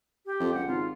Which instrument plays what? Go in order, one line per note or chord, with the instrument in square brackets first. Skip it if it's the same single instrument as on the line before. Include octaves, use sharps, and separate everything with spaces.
[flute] G4
[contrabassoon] F2
[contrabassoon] C#2 [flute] F#5
[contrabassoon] G#1 [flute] F4